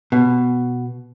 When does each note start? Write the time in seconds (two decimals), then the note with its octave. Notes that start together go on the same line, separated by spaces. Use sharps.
0.12 B2